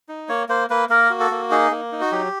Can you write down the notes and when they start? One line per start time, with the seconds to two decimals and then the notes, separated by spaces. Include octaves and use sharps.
0.09 D#4
0.29 A#3 C#5
0.49 A#3 C5
0.70 A#3 B4
0.89 A#3 A#4
1.10 F#4
1.20 A4
1.31 A#3
1.51 D#4 G#4
1.71 A#3
1.92 D#4
2.01 F#4
2.12 F#3 G4